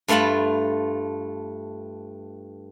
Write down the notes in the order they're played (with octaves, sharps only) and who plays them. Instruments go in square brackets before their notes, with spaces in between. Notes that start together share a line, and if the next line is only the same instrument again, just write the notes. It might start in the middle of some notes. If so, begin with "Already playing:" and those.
[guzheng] G2 A3 F4 A5 B5